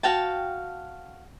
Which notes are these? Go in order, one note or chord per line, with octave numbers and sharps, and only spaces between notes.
F#4 F5 G5 A5